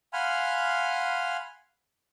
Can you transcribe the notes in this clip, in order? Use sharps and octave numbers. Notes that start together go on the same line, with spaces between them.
F5 F#5 G#5 B5 C6 F6